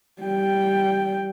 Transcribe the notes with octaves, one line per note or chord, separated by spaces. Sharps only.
G3 G5